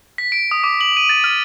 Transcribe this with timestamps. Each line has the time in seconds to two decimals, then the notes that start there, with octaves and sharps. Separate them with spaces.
0.18 B6
0.32 D7
0.51 D#6
0.64 D6
0.81 F#7
0.97 D#7
1.09 A6
1.24 F6